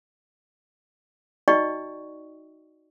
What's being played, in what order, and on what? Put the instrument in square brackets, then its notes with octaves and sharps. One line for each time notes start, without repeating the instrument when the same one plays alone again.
[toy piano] D#4 F#4 D5 D#5 G5 C#6